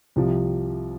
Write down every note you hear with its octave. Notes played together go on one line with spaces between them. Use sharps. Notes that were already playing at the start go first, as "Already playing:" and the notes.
C2 C3 F3